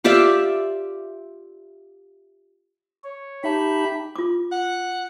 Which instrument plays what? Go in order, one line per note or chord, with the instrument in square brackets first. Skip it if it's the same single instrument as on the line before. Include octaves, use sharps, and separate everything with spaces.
[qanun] F4 G4 D5 E5
[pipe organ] C#5
[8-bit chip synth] D#4 E5 A5 [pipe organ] G4 B5
[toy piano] F4 D6
[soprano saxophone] F#5